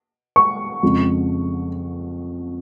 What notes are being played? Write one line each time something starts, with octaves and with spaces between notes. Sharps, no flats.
C#6
F2 C#3 G#3